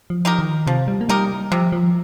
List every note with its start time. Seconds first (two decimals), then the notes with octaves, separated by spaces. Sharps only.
0.10 F3
0.25 D#4 G4 A#4
0.39 D#3
0.67 C3 F3
0.88 G3
1.01 A#3
1.09 G3 D#4 G4 A#4
1.52 C3 F3
1.72 F3